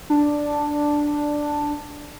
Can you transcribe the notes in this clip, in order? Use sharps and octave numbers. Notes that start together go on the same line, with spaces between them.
D4